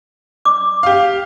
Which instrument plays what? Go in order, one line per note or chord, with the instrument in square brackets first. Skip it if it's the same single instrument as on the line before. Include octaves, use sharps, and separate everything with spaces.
[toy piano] D6
[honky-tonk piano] G4 F5